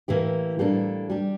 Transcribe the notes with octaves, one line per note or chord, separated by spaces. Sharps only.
A2 E3 A#3 E4 G4
A2 G3 A#3 D4 A4
G3 D4 G4